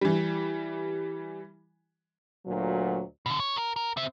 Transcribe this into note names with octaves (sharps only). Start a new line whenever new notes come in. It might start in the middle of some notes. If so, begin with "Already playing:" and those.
E3 G3
D2 A#2 F#3
B2 D3
C#5
A#4
A#4
C4 E5